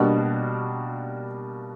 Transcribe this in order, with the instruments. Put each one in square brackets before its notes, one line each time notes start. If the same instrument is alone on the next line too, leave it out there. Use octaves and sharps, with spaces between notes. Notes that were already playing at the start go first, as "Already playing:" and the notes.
Already playing: [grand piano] B2 G3 A#3 D4 F#4